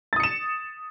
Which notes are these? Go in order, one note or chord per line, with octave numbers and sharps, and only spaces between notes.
D#6 A6 C#7 E7